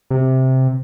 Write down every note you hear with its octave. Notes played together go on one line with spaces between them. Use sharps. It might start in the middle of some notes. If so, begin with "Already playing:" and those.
C3